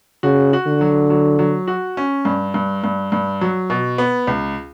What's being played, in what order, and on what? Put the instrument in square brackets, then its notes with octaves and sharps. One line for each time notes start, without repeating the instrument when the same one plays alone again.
[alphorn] C#3 [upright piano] F#4
[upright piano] F#4
[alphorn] D3
[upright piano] F#3
F#3
F#3
F#4
C#4
G2
G2
G2
G2
F#3
B2
B3
C#2